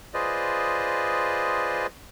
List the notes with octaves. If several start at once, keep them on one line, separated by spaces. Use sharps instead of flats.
F4 G#4 B4 C5 D5 D#5